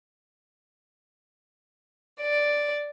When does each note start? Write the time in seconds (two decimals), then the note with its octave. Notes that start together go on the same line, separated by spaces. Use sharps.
2.21 D5